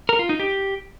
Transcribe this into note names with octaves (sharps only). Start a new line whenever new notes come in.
A#4
F4
D#4
G4